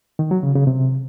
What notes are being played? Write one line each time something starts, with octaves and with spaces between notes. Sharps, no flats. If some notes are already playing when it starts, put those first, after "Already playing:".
D#3
F#3
C#3
C#3
C3